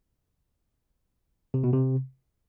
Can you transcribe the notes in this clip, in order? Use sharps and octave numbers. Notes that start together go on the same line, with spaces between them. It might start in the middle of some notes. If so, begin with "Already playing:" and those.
C3
B2
C3